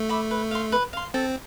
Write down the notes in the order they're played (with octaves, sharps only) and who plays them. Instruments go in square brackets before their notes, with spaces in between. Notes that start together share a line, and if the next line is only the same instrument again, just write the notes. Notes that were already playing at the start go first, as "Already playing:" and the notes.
Already playing: [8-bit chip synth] A3
[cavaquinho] E5 B5 D6
B4
F5 C6
B4
F5 C6
[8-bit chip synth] C4 [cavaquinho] A4